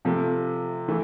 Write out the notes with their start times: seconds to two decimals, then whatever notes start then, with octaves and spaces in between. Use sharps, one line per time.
0.05 C3 F3 A3
0.88 E3 A3